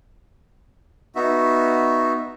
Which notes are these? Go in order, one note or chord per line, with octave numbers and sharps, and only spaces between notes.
B3 D#4 F#4 E5